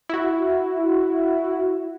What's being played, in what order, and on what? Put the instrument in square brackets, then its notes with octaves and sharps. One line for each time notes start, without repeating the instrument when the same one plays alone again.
[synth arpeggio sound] E4 F#4